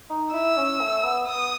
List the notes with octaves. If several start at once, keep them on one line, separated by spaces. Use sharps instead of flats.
D#4
E4 E6
C#4
A3
B3
B3 D#6